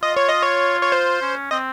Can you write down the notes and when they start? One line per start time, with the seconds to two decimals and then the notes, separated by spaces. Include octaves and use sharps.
0.02 F4 D#5
0.17 C#5
0.29 D#5
0.42 C#5
0.82 C#5
0.92 C5
1.22 C#4
1.51 C4 D#5